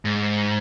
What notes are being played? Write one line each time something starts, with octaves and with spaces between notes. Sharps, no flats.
G#2